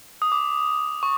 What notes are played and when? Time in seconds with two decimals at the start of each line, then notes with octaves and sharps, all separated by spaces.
0.22 D#6
0.32 D6
1.03 C#6